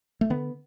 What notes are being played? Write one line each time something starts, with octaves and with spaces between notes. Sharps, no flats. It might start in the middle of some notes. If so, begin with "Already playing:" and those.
A3
D3 B3